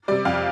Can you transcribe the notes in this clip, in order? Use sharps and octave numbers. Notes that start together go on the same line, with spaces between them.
C3 G3 D5
F2 F5